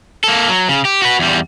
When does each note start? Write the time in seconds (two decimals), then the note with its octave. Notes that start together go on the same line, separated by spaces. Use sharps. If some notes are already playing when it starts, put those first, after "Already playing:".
0.24 A#3 A4
0.48 F#3
0.69 C#3
0.85 G4
1.02 F#4 B4
1.19 E2 G3